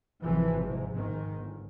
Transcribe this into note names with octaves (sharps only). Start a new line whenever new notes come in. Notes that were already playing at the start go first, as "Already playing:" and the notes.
G#1 C3 E3 F3
G#2 C3
G#2 D#3
G1